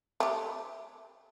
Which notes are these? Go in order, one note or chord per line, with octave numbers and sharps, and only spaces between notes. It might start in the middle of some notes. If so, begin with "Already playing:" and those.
A3 G4